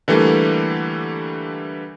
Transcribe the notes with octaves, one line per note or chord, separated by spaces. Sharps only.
D3 E3 G3 A3 A#3